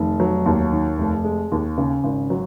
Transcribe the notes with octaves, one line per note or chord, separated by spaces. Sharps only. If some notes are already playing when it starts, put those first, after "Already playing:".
Already playing: F1 D#3
F#3
D#2
D#3
F1
G#3
D#2
C#3
G#1
F#3